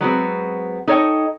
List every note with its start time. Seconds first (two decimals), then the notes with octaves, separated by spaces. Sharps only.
0.01 F#3 G#3 B3 C4 F4 F#4
0.87 D#4 A4 C#5 D#5 G5